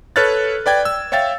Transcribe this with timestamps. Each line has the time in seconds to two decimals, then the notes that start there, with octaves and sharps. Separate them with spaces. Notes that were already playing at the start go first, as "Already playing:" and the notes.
0.16 A4 B4 C#5 F6 F#6 A6
0.66 B4 D5 G5 G#6
0.85 E6
1.12 C#5 E5 F5 G5 A6